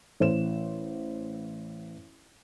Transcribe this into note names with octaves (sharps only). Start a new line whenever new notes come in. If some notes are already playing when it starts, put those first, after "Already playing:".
A1 C5 E7